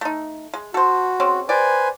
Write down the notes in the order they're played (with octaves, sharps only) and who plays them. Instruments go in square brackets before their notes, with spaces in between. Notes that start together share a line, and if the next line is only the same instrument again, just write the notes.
[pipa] A3 D#4
G#3
[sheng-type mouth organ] F#4 [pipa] A4 C5
[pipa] G#3 C4 C#4
[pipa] G4 D5 [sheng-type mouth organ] B4 C5 G#5